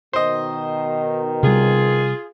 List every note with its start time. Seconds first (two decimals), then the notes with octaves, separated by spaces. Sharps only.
0.13 B2 D#3 C5 D#5
1.43 C3 G3 F4 G#4